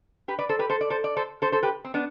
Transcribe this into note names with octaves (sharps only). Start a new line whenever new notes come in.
G4 B4
B4 D5
A4 C5
G4 B4
A4 C5
D5
A4 C5
D5
A4 C5
A4 C5
A4 C5
G4 B4
C4
B3 D4